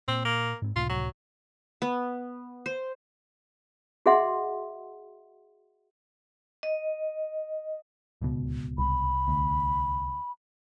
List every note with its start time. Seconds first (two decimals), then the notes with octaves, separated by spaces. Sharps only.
0.08 A#2 C4
0.25 A#3
0.62 G#2 C4
0.76 C#2 A2 C3 F4
0.89 F#3
1.82 B3
2.66 C5
4.06 F#4 G#4 D#5 E5 F#5 C6
6.63 D#5
8.22 D1 C#2 B2
8.78 C2 B5
9.28 D2